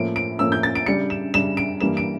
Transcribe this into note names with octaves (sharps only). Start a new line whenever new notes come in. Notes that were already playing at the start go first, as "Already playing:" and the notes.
Already playing: A2 F3 A#3 C#4 D7
D7
A2 F3 A#3 C#4 E6
G6
A6
D7
C#3 G3 D4 C#7
E7
C#3 G3 D4 E7
D7
G2 E3 G3 A#3 E7
D7